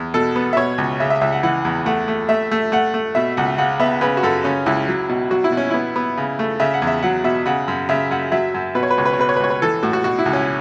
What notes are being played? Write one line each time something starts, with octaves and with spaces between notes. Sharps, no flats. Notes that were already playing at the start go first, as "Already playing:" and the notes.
Already playing: E2
B2 A4
B3
E5
B2 C#5
C#2
C#3 E5
E5
C#2 E5
F#5
E3 F#5
E2
A3 F#5
A3
A3 E5
A3
A3 F#5
A3
B2 E5
C#2 F#5
C#3 F#5
B3 E5
C#3 B4
F#4
F#2 A4
C#3 C#4
C#2 E4
F#3
B2
F#3 F#4
E4
B2
C#4
B3 E4
B3
C#3
A3
C#3 E5
F#5
E2
E5
F#3 F#5
B2 E5
C#3 F#5
F#2
C#3 E5
F#2 F#5
F#3 E5
F#2
B2 B4
C#5
B4
C#2 C#5
B4
C#5
B2 B4
C#5
B4
C#2 C#5
B4
E3 A4
A2 F#4
F#4
B2 F#4
E4
C#2
C#4